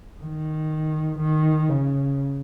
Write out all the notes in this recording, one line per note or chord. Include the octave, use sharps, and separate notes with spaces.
D#3
D#3
C#3